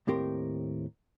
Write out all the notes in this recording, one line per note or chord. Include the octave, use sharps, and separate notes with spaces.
D#2 A2 C4 G4 A#4 C6